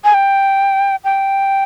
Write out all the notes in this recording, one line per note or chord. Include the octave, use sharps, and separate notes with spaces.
G#5
G5
G5